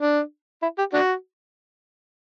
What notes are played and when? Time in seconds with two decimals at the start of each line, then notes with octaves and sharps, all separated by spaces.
0.01 D4
0.62 E4
0.78 G4
0.94 D4 F#4